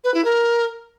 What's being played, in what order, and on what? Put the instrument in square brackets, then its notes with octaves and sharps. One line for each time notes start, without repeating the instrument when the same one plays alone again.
[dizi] B4
E4
A#4